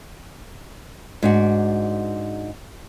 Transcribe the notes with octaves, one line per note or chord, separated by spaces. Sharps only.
G#2 D4 F#4